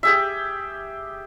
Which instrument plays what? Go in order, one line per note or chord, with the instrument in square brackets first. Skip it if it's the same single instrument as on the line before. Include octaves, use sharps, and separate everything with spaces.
[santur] G4 G#4 E5